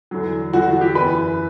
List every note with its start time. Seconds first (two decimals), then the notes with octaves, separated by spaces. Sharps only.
0.11 E2 D3 F#3
0.53 E2 D3 F#3 F#4
0.68 F#4
0.81 G4
0.95 F#2 E3 B3 B4